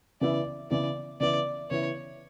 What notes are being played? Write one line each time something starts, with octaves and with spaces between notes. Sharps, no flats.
C#3 E3 B3 E4 D5
C#3 E3 B3 E4 D5
C#3 E3 B3 E4 D5
C#3 E3 B3 E4 C#5